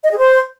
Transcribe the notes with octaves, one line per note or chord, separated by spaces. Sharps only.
D#5
G#4
C5